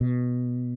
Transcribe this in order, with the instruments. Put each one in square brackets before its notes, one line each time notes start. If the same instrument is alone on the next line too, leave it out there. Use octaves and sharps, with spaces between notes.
[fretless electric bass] B2